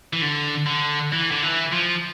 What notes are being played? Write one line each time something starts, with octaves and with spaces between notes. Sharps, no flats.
E3
D3
D3
E3
D3
E3
F3